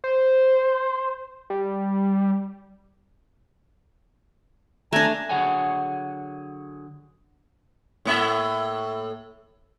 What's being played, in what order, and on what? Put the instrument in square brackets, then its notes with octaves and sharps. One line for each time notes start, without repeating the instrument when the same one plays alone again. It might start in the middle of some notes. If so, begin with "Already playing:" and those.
[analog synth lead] C5
G3
[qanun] A3 D4 [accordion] G#5 A#5
[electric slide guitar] D3 F#3 G#4 C#5 F#5 G#5
[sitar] A2 A#3 E5